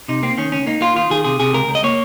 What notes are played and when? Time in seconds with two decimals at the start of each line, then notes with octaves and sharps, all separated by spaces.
0.08 C3 D#4
0.23 A#3 C4
0.38 D#3 C#4
0.52 C#2 C#4
0.66 A#3 D#4
0.81 A#3 F4
0.95 D#3 F4
1.10 D#3 G#4
1.24 C3 G#4
1.40 C3 G#4
1.54 C#2 A#4
1.68 C#2
1.75 D#5
1.84 A#3 C#5